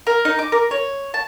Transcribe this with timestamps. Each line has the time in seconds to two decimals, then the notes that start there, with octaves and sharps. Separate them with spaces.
0.07 A#4
0.25 D#4
0.39 D6
0.52 A#4
0.71 C#5
1.14 A5